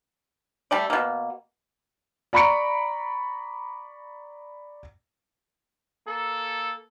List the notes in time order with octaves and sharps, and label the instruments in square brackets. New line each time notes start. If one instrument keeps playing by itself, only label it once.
[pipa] G3 A3 D5
B2 A#3
[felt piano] D5 A#5 B5 C#6 C#7 D7
[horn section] A#3 A4